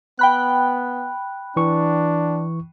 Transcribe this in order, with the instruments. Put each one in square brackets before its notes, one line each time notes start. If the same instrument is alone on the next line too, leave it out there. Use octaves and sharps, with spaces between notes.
[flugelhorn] B3 [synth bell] G5 B5 F#6
[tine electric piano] E3 C#6 [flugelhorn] D4